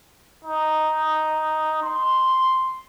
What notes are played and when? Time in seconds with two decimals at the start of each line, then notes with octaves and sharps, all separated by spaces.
0.44 D#4
1.83 C6